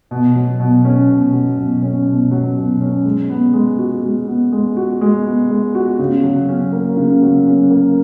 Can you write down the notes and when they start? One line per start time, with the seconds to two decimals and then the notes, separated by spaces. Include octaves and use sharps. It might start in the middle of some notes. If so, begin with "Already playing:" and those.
0.11 B2
0.35 F#3
0.60 B2
0.85 C#4
1.09 B2
1.33 F#3
1.58 B2
1.83 C#4
2.07 B2
2.31 F#3
2.56 B2
2.81 C#4
3.05 G#3
3.30 B3
3.53 G#3
3.79 F#4
4.03 G#3
4.27 B3
4.52 G#3
4.77 F#4
5.01 G#3
5.25 B3
5.50 G#3
5.75 F#4
5.99 C#3
6.24 F#3
6.49 C#4
6.73 A#3
6.97 C#3
7.21 F#3
7.47 C#4
7.71 A#3